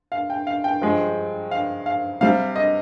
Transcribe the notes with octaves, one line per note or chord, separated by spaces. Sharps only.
F5
G5
F5
G5
G2 F3 G#3
F5
F5
C3 G3 F5
D#5